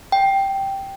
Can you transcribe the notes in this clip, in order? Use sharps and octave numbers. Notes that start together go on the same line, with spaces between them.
G5